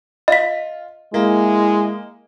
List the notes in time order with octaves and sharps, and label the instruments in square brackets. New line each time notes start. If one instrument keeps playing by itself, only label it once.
[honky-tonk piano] F4 [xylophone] D#5 B6
[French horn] G#3 [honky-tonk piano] A#3 [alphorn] E4